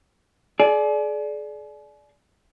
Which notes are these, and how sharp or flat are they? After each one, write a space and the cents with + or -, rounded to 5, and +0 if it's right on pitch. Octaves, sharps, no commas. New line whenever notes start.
G#4 +40 D5 +0